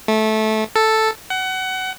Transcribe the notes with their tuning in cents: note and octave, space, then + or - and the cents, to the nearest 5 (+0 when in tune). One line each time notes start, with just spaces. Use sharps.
A3 -15
A4 +0
F#5 +25